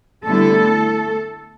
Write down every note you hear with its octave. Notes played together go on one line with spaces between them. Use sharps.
D3 G3 A3 B3 E4 A4